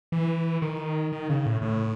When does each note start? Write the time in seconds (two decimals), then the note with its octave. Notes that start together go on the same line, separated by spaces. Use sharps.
0.12 E3
0.62 D#3
1.12 D#3
1.30 C#3
1.46 A2
1.62 A2